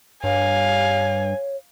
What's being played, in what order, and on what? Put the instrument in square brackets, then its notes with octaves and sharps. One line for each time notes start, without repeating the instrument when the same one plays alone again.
[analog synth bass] G2 [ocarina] C#5 [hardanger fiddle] F5 [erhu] G#5